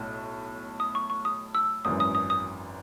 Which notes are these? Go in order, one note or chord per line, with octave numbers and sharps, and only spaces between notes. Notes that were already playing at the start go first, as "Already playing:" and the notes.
Already playing: B1 A2
D#6
C#6
C#6
D#6
E6
G#1 F#2 E3 D#6
D#6
D#6
D#6